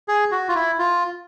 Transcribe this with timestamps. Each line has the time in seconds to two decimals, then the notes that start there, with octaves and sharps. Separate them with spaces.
0.08 G#4
0.31 F#4
0.48 F4
0.55 E4
0.79 F4